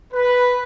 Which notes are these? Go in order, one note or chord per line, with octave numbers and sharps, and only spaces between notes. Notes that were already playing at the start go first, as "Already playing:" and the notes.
B4